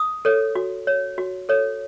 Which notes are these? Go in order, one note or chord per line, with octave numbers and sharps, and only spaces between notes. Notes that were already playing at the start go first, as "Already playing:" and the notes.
Already playing: D#6
A4 C#5
F#4
C#5
F#4
A4 C#5